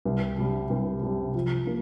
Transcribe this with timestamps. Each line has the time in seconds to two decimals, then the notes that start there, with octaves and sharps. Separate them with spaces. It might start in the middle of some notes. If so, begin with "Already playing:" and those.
0.05 C2
0.38 C3 G3
0.70 C2
1.02 C3 G3
1.34 F3
1.67 A#3